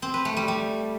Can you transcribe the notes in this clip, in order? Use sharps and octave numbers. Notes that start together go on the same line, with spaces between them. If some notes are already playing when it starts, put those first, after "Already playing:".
C4
B4
A3
G3
G3